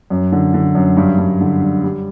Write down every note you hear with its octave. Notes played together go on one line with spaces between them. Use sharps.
F#2
D3
D3
F#2
G2
G2
D3
G2
G3